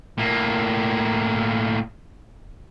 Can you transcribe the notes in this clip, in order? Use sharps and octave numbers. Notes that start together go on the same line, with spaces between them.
A2 A#3